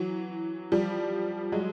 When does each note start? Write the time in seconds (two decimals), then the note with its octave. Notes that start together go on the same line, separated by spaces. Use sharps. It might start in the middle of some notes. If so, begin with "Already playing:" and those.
Already playing: E3 F#3
0.72 F3 G3
1.52 F#3 G#3